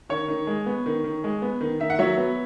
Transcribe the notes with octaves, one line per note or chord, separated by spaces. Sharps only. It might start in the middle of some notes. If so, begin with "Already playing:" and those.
D#3 C#5
D#3
G#3
B3
D#3
D#3
G#3
B3
D#3
D#3 E5
F#5
F#3 C#5 E5
B3